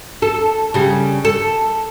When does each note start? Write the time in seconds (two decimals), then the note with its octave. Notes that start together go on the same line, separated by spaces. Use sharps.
0.22 A4
0.74 C#3 G3
1.25 A4